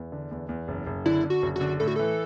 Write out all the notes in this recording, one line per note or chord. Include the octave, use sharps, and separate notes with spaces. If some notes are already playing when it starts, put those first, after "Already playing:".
Already playing: E2
D3
E2
E2
F#1
F#1
D3 E4
D3
F#4
F#1
F#4
D3
A2 A4
F#4
E3 A4